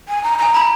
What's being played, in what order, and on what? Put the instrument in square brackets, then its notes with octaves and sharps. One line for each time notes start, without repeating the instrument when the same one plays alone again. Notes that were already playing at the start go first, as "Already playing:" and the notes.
[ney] G#5
A#5
[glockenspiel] G#5 [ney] A#5
[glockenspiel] A#5 [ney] B5